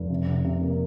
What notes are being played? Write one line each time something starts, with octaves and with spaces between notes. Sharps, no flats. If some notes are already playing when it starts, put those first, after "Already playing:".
Already playing: F1
C3
C3
C3
A#3